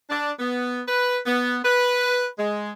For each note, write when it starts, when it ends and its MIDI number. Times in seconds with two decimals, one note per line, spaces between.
0.10 0.32 62
0.40 0.82 59
0.88 1.18 71
1.26 1.59 59
1.64 2.27 71
2.37 2.71 56